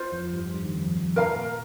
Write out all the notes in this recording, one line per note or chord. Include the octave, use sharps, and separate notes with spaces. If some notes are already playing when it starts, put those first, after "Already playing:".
Already playing: F4 C5
F2 F3
G2 G3
G2 G3
D#3
F2 F3
F2 F3
C3 A#4 F5 A#5
A#2